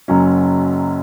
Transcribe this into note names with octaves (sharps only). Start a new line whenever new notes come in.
F#1 F#2 F#3 C#4